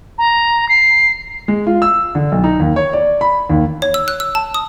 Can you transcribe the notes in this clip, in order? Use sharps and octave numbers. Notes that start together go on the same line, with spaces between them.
A#5
C7
G#3
F4
E6
D3
B1
D#4
D#2
C#5
D5
B5
D#2
C#5
E6
F#6
E6
A5
D#6